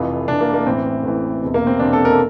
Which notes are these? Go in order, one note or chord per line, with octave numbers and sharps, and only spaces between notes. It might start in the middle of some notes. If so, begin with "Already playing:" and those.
Already playing: F1 F2 E3 F4
F1 F2 E3 D4
A#3
A#3
A1 A2 E3 C4
A1 A2 E3
E1 E2 C3
A#3
C4
E1 E2 C3 D4
A4
A#4
A4